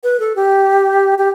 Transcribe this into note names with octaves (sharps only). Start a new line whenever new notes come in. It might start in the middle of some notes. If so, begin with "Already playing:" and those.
B4
A4
G4
G4